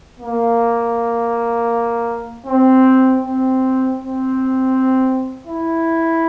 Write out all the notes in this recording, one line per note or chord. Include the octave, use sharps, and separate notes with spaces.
A#3
C4
C4
C4
E4